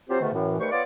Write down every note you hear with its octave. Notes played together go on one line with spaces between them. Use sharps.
C3 F#3 C4 F4 G4 C5
G#2 B2 D3 D#3 A3
F#2 A2 E3
D#2 G3 A3 B4 C5 C#6
B3 F4 C#5 D5